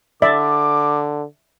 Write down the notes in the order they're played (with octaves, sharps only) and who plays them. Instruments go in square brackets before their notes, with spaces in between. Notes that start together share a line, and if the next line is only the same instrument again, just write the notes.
[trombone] D3 [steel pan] D5 E5 [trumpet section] D6